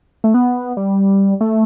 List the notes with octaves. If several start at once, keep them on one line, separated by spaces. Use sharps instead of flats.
A3
B3
G3
A3